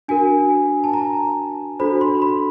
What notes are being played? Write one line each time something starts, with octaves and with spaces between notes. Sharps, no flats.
D4 F#4 A#4 G#5
A5
A#5
D4 F#4 A4 C5 B5
C6
B5